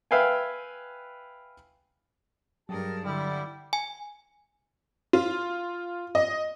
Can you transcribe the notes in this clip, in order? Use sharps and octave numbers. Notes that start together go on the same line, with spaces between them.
B4 E5 F5 G5 G#5
G2 F#3 G4 G#4 A#4 A5
D3 G3 E4
G#5
F4
D#5